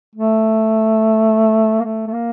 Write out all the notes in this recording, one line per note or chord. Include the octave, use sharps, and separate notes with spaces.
A3
A#3
A3
A3
A#3